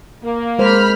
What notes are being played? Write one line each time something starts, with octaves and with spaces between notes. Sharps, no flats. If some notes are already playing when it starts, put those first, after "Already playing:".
A#3
G#3 A#4 C5 B5 F6